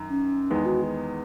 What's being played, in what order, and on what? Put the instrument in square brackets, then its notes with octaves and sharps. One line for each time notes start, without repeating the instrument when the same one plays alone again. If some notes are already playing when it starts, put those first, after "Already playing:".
Already playing: [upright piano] F#2 D#3
[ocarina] C#4
[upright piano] E2 D#3 G#3 B3 [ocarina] D#4
[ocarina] F#4